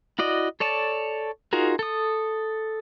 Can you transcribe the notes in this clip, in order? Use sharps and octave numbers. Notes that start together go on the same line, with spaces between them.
E4 F#4 D5 D#5
A4 C#5 D5 A5
D#4 F4 F#4 G#4 A#4
A4 D#6